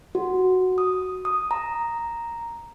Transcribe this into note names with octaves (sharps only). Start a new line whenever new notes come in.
F#4
D#6
D#6
A#5